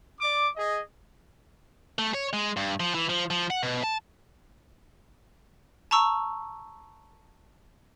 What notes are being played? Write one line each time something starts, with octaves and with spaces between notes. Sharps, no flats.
D5 D6
G#4 D#5
A3
C#5
G#3
G2
F3
E3
F3
F3
F#5
B2
A5
A5 A#5 C#6 E6